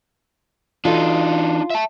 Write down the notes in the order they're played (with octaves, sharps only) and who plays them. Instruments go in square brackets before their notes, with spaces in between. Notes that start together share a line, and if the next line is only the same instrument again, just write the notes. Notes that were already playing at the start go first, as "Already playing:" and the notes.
[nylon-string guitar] E3 F#4 A4 [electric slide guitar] D4 D#4 [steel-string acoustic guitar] F4
[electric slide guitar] E5 A5